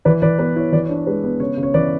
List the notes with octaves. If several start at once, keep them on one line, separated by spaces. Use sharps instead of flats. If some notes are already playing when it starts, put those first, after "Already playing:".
E3 B4 D5
E3 B4 D5
B3 B4
E4 C#5
E3 B4 D5
C#5
D4
C#5
G#3 B4
B3
C#3 C#5
C#3
C#5
E3 B4 D5